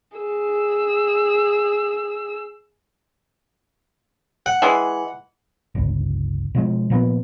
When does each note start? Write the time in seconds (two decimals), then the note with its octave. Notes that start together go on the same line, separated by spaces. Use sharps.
0.17 G#4 E6
4.46 F#5
4.62 E3 G#3
5.75 G1 C#2
6.55 B2 F3 G#3
6.90 A#2 F3 A#3 B3